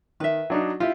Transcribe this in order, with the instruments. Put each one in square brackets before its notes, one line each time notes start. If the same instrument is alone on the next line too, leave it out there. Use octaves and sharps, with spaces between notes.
[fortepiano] D#3 [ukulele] B4 E5
[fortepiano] F#3 D4 D#4
[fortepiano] E4 F4 [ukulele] G4